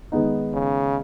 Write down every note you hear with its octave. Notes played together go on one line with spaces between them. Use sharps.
D#3 G#3 B3 D#4
C#3